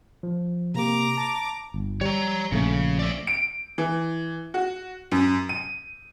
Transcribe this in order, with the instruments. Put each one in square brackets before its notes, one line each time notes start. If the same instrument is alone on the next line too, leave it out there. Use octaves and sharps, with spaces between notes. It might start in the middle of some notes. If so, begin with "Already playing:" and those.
[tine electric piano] F3
[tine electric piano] C3 A#3 G4 [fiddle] A#5 D6
[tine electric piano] A5
[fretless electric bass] G1
[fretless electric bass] G3 [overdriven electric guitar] C#5 A#5
[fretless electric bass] A#1 A3 [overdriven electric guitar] C#3
[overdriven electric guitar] D5 E5
[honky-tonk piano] D7
E3
F#4
F#2
D#7